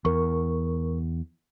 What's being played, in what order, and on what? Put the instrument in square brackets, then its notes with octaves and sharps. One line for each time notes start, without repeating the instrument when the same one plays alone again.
[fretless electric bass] E2 [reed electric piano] A#4 C#6